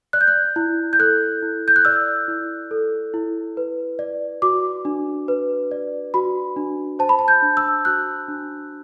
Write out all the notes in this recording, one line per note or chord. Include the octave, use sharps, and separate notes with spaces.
D5 F#6
G6
F#6
E4
G6
A4 F#6
E4
G6
F#6
D5 E6
E4
A4
E4
B4
D5
F#4 D6
D4
B4
D5
F#4 B5
D4
C5 A5
B5
A5
G6
D4
E6
F#4 F#6
D4